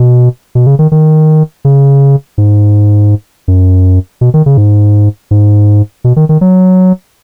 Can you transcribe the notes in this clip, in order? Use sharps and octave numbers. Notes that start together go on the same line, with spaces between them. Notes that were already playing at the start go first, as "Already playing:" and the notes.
Already playing: B2
B2
C#3
D#3
D#3
C#3
G#2
F#2
B2
D#3
C#3
G#2
G#2
B2
D#3
D#3
F#3